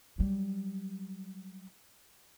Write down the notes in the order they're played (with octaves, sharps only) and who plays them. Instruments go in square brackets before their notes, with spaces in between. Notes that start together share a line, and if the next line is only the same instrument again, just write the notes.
[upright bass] F#3 G3